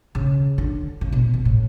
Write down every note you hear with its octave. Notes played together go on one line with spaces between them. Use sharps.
C#3
D3
C#3
B2
B2
A2